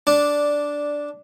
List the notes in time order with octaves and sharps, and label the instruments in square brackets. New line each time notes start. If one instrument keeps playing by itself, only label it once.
[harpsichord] D4